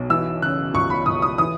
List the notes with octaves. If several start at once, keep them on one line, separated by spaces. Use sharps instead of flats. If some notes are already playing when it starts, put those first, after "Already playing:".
Already playing: B1 B2
E3 E6
C#3 F#6
C#2 C#6
B5
C#2 D#6
D#6
E3 D#6